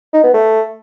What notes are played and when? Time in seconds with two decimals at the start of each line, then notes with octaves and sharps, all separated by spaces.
0.13 D#4
0.24 B3
0.34 A3